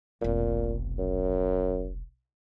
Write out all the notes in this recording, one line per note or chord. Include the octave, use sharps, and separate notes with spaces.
F1 B1 A#2
F#2